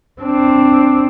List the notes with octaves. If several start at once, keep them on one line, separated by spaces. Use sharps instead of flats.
C4 D4